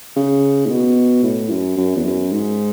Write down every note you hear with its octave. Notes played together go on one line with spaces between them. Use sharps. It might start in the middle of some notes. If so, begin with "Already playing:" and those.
C#3
A2
B2
A2
F#2
F#2
E2
F#2
G#2